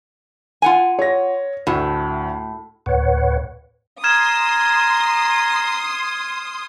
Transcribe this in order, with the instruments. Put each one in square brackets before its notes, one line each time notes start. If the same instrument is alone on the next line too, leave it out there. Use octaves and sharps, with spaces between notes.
[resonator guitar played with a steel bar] F4 F#5 G#5
[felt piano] C#5 A#6
[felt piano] D2 [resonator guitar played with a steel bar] A2
[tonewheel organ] D2 A2 B4 C#5 F#5
[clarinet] A#5 [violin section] C6 D#6 [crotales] F6 G#6 E7